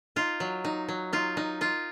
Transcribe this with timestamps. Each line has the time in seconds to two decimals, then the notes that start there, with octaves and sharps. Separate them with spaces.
0.16 D#4 F4
0.40 F#3
0.65 D#4
0.88 F#3
1.13 D#4 F4
1.37 D#4
1.61 D#4 F4